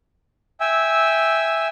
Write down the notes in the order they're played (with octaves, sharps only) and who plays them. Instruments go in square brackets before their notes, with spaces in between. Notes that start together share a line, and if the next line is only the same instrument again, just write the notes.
[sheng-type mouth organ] E5 G5 G#5 E6